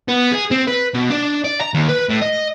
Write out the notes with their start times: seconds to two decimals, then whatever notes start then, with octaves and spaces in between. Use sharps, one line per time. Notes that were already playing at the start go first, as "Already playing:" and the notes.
0.08 B3
0.32 G#4
0.51 C4
0.67 B4
0.94 B2
1.10 D4
1.44 D5
1.61 A#5
1.74 D#2
1.89 B4
2.09 A2
2.21 D#5